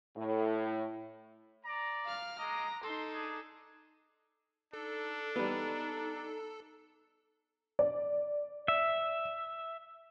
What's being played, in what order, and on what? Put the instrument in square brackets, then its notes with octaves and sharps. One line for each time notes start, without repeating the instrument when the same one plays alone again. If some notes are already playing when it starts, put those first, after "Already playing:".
[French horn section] A2
[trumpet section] D5 A#5
[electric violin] F5 F6
[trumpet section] G#3 D#5 D6 [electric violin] A#5
[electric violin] D#4 A4 [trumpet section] C6
[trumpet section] D4 G#4
[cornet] D4 [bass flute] D#4 [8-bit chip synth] A4
[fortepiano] G3 B3 [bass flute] D#4
[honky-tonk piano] D5
[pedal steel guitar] E5